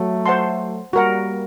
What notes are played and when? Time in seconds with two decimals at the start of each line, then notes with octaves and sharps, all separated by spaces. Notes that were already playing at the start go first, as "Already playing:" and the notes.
Already playing: F#3 A3
0.26 C5 F#5 A5 C6
0.93 G3 A#3 F#4 A#4 F#5